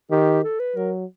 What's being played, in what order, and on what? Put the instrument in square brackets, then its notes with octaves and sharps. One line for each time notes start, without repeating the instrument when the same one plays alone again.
[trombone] D#3 [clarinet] G4
[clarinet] A4
B4
[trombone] F#3 [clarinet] A#4